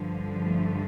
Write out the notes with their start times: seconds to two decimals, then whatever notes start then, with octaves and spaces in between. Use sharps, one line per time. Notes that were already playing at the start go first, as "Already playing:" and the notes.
Already playing: G2 D3 F3
0.43 A3